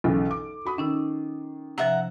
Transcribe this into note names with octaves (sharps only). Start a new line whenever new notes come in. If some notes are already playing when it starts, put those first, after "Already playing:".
B1 C#3 E3 A4
D6
F#4 B5 D#6
D#3 C#4 D#4 E6
C3 F3 E5 F#5 A#5